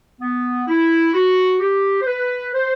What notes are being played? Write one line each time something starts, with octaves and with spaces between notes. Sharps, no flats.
B3
E4
F#4
G4
C5
B4
C5